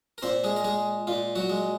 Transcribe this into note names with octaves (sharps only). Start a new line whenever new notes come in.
A#4
A#2 C4 C5
G#3 G#4
A#4
G#3 G#4
A#2 F4
F#3 F#4
G#3